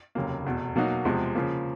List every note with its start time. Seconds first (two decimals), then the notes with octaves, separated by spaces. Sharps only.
0.15 F1 D#2 C#3 F#3 A#3
0.45 F1 E2 B2
0.75 B2 F#3 A#3 D#4 F#4
1.05 E2 C3 F3 G#3
1.35 C#3 F3 A#3